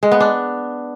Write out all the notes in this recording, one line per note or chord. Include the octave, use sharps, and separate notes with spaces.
G#3
B3
D4